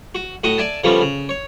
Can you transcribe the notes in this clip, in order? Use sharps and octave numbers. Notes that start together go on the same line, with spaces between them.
F#4
A2 F#4 D#5 F#5 D#6
D5 E5 G#5 A5
C#3 F3 G3 A3 B3
C#3
C#5